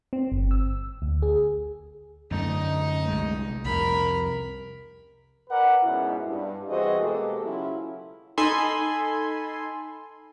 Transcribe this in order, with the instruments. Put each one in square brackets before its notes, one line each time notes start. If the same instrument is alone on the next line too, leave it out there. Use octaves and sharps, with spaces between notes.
[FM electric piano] C4
G1
E6
D2
G#4
[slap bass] F#2 D3 A3 [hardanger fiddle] D#4 D#5
[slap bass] C2 G#3 A3
[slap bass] C2 F2 [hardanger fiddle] A#4 B5
[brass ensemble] A#4 B4 D5 F#5
G#2 B2 C#4 E4
G2
E3 C4 F#4 G#4 C5 D#5
B2 G#3 A#3 G4 A4
C#3 F#3 C#4 E4 F4
[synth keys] D#4 A4 G#5 B5 C6